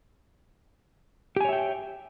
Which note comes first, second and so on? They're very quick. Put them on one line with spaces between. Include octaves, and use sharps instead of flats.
G4 G#5 C#5 E5 G5